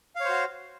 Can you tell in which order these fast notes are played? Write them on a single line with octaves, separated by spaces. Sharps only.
F5 C#5 C5 F#4